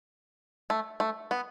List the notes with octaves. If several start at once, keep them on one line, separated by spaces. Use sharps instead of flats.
A3
A3
B3